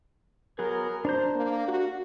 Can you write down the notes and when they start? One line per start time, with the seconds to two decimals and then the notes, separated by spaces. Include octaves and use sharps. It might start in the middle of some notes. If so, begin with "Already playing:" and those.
0.59 F#3 B3 G#4 A#4
1.05 D4 C5 A#5 G6
1.36 A#3
1.68 F#4